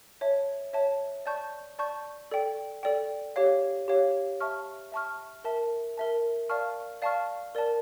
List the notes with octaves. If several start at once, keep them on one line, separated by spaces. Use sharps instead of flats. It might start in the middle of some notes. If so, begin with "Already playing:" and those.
C#5 E5 A5
C#5 E5 A5
D5 A5 C#6 G6
D5 A5 C#6 G6
A4 D5 G5
A4 D5 G5
G4 C#5 F5
G4 C#5 F5
E5 A5 C#6 F6
E5 A5 C#6 F6
A#4 E5 A5
A#4 E5 A5
D5 F5 A5 C#6 F6
D5 F5 A5 C#6 F6
A#4 D5 A5